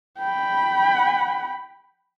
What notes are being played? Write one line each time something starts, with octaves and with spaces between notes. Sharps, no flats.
G5 B5